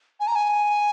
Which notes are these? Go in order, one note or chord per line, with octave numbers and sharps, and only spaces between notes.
G#5
A#5
G#5